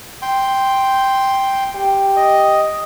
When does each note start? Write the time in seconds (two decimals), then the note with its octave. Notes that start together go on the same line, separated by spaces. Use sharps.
0.22 G5 C6
1.75 G4
2.16 D#5